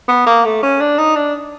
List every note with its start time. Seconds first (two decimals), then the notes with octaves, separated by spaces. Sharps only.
0.08 B3
0.27 A#3
0.45 A3
0.63 C#4
0.80 D4
0.98 D#4
1.15 D4